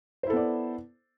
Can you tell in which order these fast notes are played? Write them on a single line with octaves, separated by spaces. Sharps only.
C5 E4 A4 B3 D5